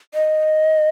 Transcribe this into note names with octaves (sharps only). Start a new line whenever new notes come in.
D#5